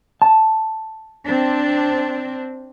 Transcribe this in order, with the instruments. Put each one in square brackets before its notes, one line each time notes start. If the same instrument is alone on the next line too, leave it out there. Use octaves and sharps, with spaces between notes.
[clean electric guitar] A5
[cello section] C4 D4